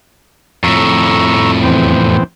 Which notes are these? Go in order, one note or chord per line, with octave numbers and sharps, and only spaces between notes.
F2 A2 A#5 C#6 E6
E2 C4